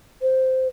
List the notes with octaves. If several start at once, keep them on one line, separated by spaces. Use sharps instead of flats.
C5